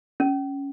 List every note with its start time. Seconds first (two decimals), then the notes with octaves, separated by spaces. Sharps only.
0.20 C#4